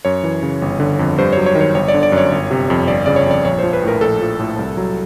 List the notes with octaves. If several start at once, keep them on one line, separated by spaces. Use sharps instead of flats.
F#2 C#5
E3
C#3
G1
D3
F2
G2 C5
F#3 C#5
C#5
D#3
C#5
G1 C#5
D5
D3
D5
F#2
C#5
G1
C3
F2
G1 D5
C#3 D5
C#5
F2 D5
A#1 C#5
C5
F3
B4
A2 A#4
A#1 A4
F3
A2
C2
F#3